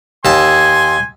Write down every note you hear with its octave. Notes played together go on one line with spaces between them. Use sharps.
D#2 G#5 A5 C6